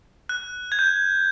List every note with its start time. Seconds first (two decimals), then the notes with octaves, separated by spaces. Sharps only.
0.29 F#6
0.72 G#6
0.79 G6